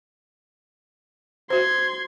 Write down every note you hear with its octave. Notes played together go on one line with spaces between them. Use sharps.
F#4 C5 C6 G#6